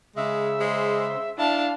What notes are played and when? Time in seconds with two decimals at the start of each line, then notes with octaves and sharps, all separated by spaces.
0.16 C#3 G#3 E5
0.60 G#3 C5
1.38 D4 E4 F5 A5